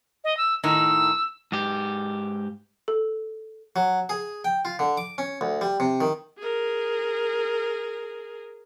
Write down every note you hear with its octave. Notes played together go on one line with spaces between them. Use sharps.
D#5
E6
A2 D#3 D#4 E6
G#2 G4
A4
F#3
G#4
G5
F4
D3
D6
C#4
D2
G3
C3
D#3
G#4 A#4